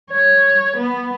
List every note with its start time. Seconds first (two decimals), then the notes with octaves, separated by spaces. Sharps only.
0.11 C#5
0.77 B3